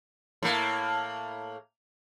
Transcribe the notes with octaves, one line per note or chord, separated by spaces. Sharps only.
A2 A#3